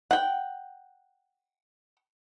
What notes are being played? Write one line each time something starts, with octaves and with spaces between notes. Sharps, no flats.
F#5 G5